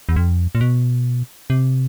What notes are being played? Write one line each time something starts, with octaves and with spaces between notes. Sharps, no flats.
E2
F2
A#2
B2
C3